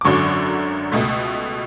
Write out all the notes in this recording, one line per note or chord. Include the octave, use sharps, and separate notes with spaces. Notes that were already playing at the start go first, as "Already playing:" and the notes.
D6
G#1 F#2 D3 F#3 C#6
C#2 B2 A3